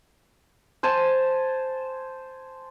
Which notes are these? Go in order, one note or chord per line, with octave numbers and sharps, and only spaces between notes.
C5 G#5 A5